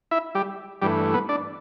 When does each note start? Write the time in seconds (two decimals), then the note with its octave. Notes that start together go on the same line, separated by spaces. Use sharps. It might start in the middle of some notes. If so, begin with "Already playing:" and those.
0.11 E4 E5
0.35 G3 G4
0.82 G2 E3 G3 A3 G4
1.14 B3 B4
1.29 D4 D5